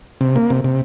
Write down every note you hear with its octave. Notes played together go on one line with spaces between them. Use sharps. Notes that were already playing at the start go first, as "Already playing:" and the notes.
C3
A#3
C3
C3